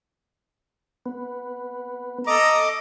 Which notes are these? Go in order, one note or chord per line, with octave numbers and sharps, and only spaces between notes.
B3
A4 D#5 A#5 D6